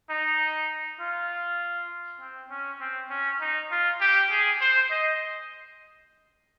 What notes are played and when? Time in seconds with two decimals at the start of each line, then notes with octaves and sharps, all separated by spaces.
0.10 D#4
1.00 F4
2.20 C4
2.50 C#4
2.81 C4
3.10 C#4
3.41 D#4
3.71 F4
4.01 G4
4.31 G#4
4.61 C5
4.91 D#5